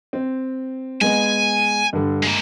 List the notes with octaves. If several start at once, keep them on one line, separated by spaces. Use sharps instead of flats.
C4
G#3 B3 G#5
G2 D3
G#3 A#3